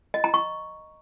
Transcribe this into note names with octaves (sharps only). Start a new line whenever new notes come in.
D#5
A#5
C#6